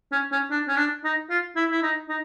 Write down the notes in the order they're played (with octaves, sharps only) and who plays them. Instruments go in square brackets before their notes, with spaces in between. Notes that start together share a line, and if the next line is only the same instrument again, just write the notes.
[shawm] C#4
C#4
D4
C#4
D4
D#4
F4
E4
E4
D#4
D#4